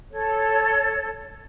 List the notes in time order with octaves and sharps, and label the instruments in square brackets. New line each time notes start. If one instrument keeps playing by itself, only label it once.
[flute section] A4 C#5